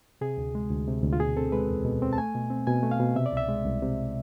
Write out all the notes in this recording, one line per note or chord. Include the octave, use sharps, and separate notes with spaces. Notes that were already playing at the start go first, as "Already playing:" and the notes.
C3 G#4
D2
G#3
D2
C3
D2
F4
B2 G#4
C4 A4
G#3 B4
E2
B2
C4
A5
A3 G#5
B2
C4
B2 G#5
A3
F5
B2
C3 E5
D5
C2 E5
G#3
C2
C3